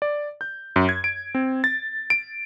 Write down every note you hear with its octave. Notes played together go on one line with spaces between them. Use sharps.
D5
G6
F#2
G#6
D7
C4
A6
D7